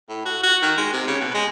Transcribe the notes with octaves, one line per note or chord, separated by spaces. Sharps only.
A2
F#4
F#4
D#3
G#3
C3
C#3
B2
G#3